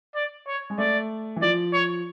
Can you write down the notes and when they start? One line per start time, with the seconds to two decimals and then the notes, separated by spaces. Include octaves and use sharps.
0.15 D5
0.47 C#5
0.70 G#3
0.78 A3 D5
1.36 E3
1.42 F3 D5
1.73 C#5